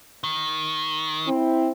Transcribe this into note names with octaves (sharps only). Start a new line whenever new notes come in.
D#3
C4 E4